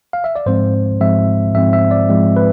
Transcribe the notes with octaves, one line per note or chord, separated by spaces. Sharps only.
F5
E5
D5
G#2 F3 G#3 C4 C5
G#2 F3 G#3 C4 E5
G#2 F3 G#3 C4 E5
E5
D5
G#2 F3 G#3 C4
B4